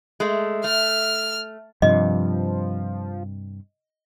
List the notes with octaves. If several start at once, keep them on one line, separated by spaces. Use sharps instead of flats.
G#3 A3
A3 F6
G2 C3 F3 D#5